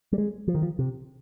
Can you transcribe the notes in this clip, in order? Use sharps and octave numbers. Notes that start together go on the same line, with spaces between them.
G3
G#3
F3
D#3
F3
C3